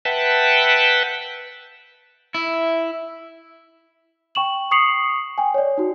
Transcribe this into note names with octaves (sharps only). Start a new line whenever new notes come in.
B4 E5 F#5 G5 A5
E4 E5
G5 C#6 E7 F#7
C#6 D#6 C7 C#7 F7 F#7
G5 G#5
C#5 D5
D#4 F#4